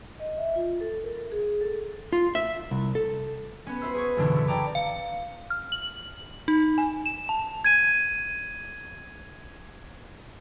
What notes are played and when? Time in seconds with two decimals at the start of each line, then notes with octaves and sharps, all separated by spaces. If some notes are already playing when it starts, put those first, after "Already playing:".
0.20 D#5
0.38 E5
0.56 F4
0.81 A4
1.04 A#4
1.32 G#4
1.61 A4
2.13 F4
2.35 E5
2.71 C2
2.95 A4
3.67 B3 C#4
3.82 F#4 B4 C5 E5
3.95 G#4 C#6
4.17 F#2 B2 D3 E3 C#4 D4
4.34 C#3 E4
4.48 D5 G5 A5 A#5 D6
4.75 F5
5.50 F6
5.72 F#7
6.48 D#4
6.78 G#5
7.06 E7
7.29 A5
7.64 G#6 D#7